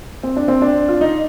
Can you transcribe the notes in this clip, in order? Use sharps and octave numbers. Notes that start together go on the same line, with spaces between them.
C4
D4
C4
D4
F4
D#4